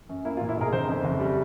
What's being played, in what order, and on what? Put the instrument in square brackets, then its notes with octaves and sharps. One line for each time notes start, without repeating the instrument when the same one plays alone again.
[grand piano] F#2
A#3 E4
F4
A#2
E4
B1 G#4 A#4
F#1 A#4 C5
F2
F#1
G3